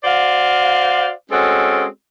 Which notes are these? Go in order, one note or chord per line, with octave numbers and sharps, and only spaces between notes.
F#4 C5 D5 F5
G#3 C4 C#4 F#4 A4